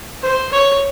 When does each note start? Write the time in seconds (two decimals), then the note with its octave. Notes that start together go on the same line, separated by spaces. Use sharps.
0.22 C5
0.52 C#5